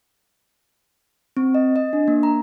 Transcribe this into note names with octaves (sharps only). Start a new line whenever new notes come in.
C4
D#5
D#5
D4
A#3
A#5